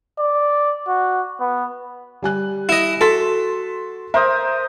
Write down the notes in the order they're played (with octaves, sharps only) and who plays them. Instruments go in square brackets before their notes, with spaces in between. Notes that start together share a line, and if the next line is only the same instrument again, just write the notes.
[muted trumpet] D5
F#4
B3
[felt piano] G3 G#5 F#6
[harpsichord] E4 D#5
[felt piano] F#4 C6 B6 [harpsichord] A4
[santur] A#4 C5 D#6 [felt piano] E5